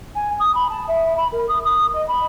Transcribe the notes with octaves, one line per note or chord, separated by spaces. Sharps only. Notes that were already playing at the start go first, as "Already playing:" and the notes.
G#5
D#6
B5
A5
E5
B5
A#4
D#6
D#6
D#5
B5